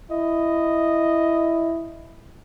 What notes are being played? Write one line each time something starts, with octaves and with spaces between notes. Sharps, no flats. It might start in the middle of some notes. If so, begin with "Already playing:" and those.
E4 D#5